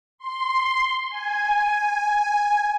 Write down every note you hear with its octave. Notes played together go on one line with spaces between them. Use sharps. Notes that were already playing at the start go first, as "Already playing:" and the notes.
C6
G#5